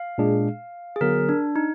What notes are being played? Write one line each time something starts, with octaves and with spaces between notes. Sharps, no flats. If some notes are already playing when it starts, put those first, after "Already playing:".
Already playing: F5
A#2 G#3 D4 G#4
G#4
D3 F#3 B3 A#4
D4
D#4